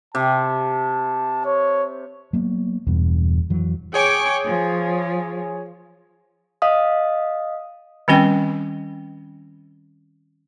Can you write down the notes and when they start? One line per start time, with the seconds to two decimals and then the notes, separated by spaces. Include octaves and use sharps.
0.15 C3 A5
1.45 C#5
2.33 F#3 A#3 B3
2.87 E1 E2 G2 B2
3.49 F2 E3 F#3
3.94 G#4 C#5 G5 G#5 C#6 D6
4.45 F3
6.62 D#5 F5 D#6
8.08 D#3 G3 C4 C#4 G5